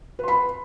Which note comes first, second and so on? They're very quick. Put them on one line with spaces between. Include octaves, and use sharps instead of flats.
B4 C6 B5